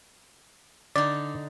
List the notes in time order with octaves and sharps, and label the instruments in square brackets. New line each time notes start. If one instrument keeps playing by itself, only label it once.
[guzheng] D3 D#4 [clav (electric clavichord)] D5